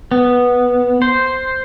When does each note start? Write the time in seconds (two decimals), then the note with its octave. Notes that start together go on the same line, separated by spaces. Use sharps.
0.11 B3
1.02 C5